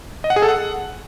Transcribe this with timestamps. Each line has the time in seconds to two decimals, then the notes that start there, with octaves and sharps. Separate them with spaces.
0.24 D#5
0.30 F#5
0.36 G#4
0.42 A4
0.49 F#5